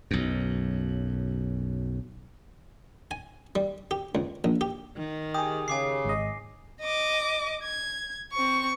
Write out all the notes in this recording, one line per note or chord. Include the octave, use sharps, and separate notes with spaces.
B1 F#2
G#5
G3
G4
C#2
A#1
G4
D#3
G4 G#4 D#6
C#3 G#5 D6 C7
G#1 D#5
D#5 D6
G#6
C4 C#6